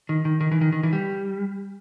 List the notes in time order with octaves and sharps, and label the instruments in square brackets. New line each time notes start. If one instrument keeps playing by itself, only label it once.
[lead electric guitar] D#3
D#3
D#3
E3
D#3
D#3
E3
G3